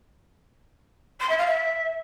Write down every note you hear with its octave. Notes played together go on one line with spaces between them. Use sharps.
C6
E5
F5
E5